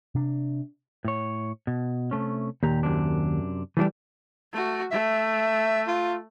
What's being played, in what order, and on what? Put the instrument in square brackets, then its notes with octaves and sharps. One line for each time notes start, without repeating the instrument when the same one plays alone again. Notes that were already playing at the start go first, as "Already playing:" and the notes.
[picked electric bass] C3 D4
[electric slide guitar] A2 C#5
B2
C3 A3 C#4
[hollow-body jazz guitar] D#2 [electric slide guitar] A#2 G4 A#5
[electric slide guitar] F#2 C3 D4
[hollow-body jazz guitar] E3 F3 G3 [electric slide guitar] A3 D4
[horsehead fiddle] A3 F#4
[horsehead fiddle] A3 [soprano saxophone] E5
[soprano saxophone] F4